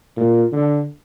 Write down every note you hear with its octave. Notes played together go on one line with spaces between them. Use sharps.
A#2
D3